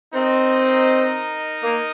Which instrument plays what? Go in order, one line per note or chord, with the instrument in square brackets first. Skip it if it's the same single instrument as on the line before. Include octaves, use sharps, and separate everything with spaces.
[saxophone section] C4 [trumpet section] D#4 A#4 D#5
[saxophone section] A#3